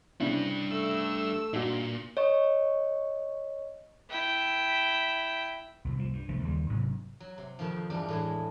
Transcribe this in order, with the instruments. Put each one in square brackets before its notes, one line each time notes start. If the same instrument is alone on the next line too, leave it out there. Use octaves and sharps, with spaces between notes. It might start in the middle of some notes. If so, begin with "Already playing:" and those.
[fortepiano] C2 C#3 [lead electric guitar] G3 D4 [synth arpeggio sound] E4
[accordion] A3 E6
[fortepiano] G2 [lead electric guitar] A#2 [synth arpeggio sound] D#4 F#4
[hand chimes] C#5 D#5 C#6
[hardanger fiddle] E4 G5
[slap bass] C2 F2
C2 F3
G2
C2 F3 A3
D#2 C#3 G3
A1 G#2 C3 F#3
[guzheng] F#3
C3
F2 B2 D#3 F3
E2 G2 D4
A2 E3 G#3